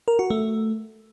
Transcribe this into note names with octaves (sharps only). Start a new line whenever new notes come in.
A#4
F#4
A3